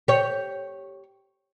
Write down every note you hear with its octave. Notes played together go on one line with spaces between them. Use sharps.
G4 C#5